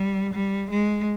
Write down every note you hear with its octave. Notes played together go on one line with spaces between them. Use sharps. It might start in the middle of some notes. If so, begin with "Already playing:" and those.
Already playing: G3
G3
G#3